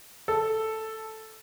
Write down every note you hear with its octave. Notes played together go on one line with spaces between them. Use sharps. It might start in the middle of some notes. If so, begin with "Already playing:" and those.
A4